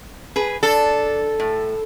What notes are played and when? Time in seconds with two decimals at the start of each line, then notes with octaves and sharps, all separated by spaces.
0.36 G#4 B4
0.63 D4 A4
1.40 A2